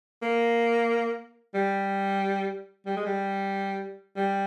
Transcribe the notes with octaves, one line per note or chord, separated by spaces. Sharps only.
A#3
G3
G3
G#3
G3
G3